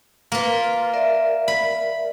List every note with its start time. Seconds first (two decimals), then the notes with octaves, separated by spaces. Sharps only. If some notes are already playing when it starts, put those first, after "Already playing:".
0.32 A#3 F4 A#4 B4
0.94 A#4 D5 E5
1.48 B5